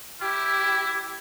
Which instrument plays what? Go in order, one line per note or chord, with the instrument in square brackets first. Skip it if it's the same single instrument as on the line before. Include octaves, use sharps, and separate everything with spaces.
[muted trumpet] E4 [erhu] G4